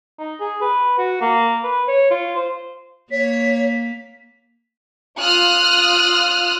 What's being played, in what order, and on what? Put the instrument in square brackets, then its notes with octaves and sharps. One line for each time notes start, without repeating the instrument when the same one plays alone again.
[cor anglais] D#4
G#4
B4
F#4
A#3
B4
C#5
F4
C5
[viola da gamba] A#3 [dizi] C#5 [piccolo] B6
[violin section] F4 D#6 F6 F#6